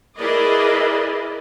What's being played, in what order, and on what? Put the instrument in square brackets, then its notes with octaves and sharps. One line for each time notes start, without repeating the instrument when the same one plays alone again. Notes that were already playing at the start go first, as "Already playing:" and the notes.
[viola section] E4 G#4 A#4 B4 D5 D#5